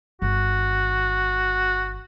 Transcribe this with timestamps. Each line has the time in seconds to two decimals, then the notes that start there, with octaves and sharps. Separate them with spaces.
0.22 G1 D#3 F#4